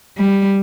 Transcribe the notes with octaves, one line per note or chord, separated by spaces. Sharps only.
G3